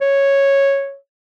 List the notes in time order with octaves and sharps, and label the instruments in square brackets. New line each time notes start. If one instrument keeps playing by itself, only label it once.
[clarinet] C#5